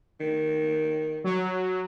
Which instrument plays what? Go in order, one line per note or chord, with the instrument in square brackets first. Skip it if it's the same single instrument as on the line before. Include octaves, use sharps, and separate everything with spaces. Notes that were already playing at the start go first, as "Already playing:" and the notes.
[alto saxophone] D#3
[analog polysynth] F#3